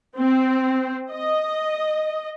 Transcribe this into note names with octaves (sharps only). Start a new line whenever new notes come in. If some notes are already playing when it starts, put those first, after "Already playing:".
C4
D#5